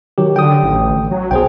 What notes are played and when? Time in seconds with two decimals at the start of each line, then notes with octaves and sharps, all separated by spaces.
0.18 D#3 F#3 G4
0.36 D3 G5 D#6
0.63 A1
1.11 F#3
1.31 B1 G#4 C5 G5